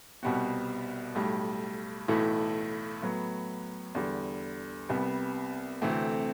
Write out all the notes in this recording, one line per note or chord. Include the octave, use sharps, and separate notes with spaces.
C2 B2 G3 C4 F#4
B1 A2 G3
B1 A2 E3 A3 E4
A2 F#3 B3
E2 D3 G3
C2 C3 G3 B3
D2 C3 E3 A3 C4